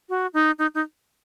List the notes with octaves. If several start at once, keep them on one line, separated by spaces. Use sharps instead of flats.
F#4
D#4
D#4
D#4